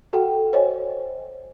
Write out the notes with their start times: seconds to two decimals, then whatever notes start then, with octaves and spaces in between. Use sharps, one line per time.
0.13 F#4 A4 F#5 G5
0.53 C5 C#5 D#5 G#5